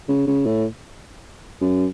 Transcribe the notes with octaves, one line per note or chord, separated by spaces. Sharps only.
C#3
C#3
A2
F#2